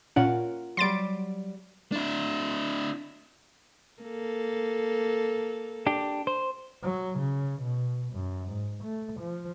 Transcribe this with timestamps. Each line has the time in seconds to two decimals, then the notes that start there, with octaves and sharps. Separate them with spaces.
0.16 A#2 C#4 F4 A#4 F#5
0.77 F#3 G3 C6 A6 D7
1.92 D4 E4
4.02 A#3 A4
5.87 D4 G4
6.27 C5
6.84 F#3
7.19 C#3
7.62 B2
8.14 F#2
8.48 G#2
8.84 A3
9.20 F3